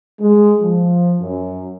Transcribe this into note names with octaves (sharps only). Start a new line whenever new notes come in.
G#3
F3
F#2